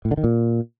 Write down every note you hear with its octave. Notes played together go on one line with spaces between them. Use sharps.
A2
D3
D#3
A#2